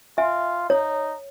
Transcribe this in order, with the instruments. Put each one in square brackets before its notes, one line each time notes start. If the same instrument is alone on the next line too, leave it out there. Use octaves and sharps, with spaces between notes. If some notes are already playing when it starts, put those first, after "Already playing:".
[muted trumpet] F4 [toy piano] E5 G#5
[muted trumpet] D#4 [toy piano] C#5